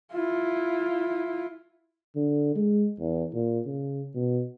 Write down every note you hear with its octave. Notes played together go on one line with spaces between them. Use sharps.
E4 F4
D3
G#3
E2
A#2
C#3
B2